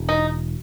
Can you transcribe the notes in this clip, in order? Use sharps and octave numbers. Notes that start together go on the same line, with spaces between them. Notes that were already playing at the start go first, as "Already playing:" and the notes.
Already playing: E1
D#4